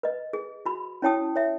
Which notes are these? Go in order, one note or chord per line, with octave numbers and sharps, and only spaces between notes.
B4 D#5
G#4
F#4 B5
C#4 E4 C#5 G5 A5 D#6
C#5 E5